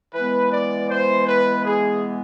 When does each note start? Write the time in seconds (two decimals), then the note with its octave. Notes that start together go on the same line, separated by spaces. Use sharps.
0.14 E3 G#3 B3 B4
0.52 D5
0.90 C5
1.27 B4
1.65 G#4